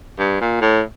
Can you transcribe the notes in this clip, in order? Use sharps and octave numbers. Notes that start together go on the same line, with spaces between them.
G2
A#2
A2